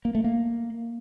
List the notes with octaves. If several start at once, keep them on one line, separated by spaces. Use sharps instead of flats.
A#3
A3
A#3